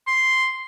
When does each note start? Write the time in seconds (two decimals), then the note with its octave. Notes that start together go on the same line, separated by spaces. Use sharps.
0.07 C6